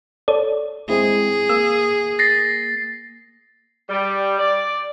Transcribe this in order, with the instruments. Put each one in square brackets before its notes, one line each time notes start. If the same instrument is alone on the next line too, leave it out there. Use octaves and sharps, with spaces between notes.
[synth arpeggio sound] A4 C#5 D5
[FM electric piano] G#3 C4 E4 [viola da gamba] G#4
[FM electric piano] A#3 [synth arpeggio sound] E6
[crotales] A6 A#6 C7
[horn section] G3
D5